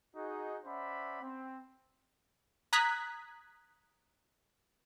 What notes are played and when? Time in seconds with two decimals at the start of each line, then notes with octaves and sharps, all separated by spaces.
0.16 D#4 F#4 G#4
0.64 C#4 C5 D5 E5 F#5 B5
1.22 C4
2.73 A#5 D#6 F#6 G#6 B6